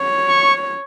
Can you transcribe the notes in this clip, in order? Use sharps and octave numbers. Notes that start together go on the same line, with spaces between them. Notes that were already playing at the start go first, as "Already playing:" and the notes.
Already playing: C#5
C#6